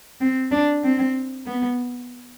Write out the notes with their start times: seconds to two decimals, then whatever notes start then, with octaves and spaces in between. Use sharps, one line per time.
0.21 C4
0.51 D4
0.84 C4
1.46 B3